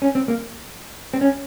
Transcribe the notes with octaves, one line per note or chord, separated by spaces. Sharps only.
C#4
C4
A#3
C4
C#4